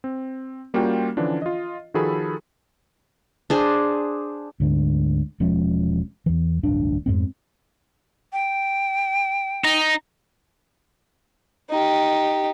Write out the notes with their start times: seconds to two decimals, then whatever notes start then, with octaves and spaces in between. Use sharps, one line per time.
0.04 C4
0.74 G3 A#3 C#4 F4 F#4 G5
1.17 D3 E3 F3 C#4 D4
1.42 F4 D#5
1.94 D#3 F3 F#4 G#4 A4 B5
3.50 D4 G#4 C5
4.60 D2 G#2 D3
5.40 E1 F3 G#3 C#4
6.26 E2 E3
6.63 D1 A1 G2 D4
7.06 F2 G#2 C4
8.33 G5
9.64 D#4
11.70 D#4 G4